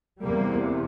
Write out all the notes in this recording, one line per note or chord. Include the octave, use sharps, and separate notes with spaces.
E2 C3 G3 A#3